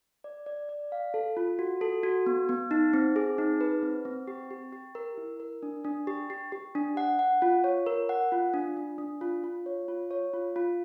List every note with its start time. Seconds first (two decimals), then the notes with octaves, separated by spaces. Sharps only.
0.24 D5
0.46 D5
0.69 D5
0.92 F5
1.14 A4
1.37 F4
1.59 F#4
1.81 A4
2.03 F#4
2.26 B3
2.49 B3
2.71 D#4
2.93 C4
3.16 G#4
3.38 D#4
3.61 B4
3.83 C4
4.05 C4
4.28 G4
4.50 G4
4.73 G4
4.95 A#4
5.17 E4
5.40 A#4
5.63 D4
5.85 D4
6.07 G4
6.30 G4
6.52 G4
6.75 D4
6.97 F#5
7.19 F#5
7.42 F4
7.64 C#5
7.86 A#4
8.09 F#5
8.32 F4
8.54 D4
8.77 D4
8.98 D4
9.21 F4
9.44 F4
9.66 C#5
9.88 F4
10.11 C#5
10.33 F4
10.56 F4